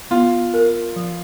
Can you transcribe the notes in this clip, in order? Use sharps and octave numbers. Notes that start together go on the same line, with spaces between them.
B3 F4
A#4
F3